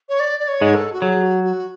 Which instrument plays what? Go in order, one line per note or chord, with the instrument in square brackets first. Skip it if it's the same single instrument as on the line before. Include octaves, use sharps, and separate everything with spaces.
[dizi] C#5
D5
D5
C#5
[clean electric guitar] G#2 G#3
[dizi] A4
F#4
[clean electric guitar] F#3 [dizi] G#4
[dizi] F#4
F#4